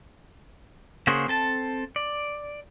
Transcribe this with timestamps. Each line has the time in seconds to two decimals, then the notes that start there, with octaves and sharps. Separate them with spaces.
1.07 C#3 A#3 F#4 G#4 C5
1.28 C4 A4 A5
1.96 D5